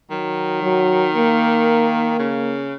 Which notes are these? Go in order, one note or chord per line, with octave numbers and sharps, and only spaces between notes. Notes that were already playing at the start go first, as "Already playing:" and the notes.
D#3 F#3
F#3
A#3
C#3